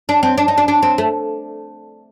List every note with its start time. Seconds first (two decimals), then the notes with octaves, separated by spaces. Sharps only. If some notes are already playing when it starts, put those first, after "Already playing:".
0.09 D4
0.23 C4
0.38 D4
0.48 D#4
0.58 D4
0.68 D4
0.82 C4
0.98 A3